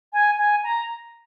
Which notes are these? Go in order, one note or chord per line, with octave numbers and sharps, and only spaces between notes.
G#5
G#5
A#5